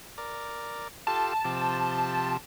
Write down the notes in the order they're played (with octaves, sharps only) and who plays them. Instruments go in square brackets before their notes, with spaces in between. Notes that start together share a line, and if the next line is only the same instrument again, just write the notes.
[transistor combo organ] A#4 D5
[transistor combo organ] F4 G4 A4 [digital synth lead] A5
[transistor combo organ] C3 F3 G4